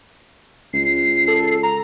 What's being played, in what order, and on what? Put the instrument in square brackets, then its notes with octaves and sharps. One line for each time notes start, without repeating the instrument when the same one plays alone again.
[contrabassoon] C#2 [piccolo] C7
[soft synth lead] A4
A#5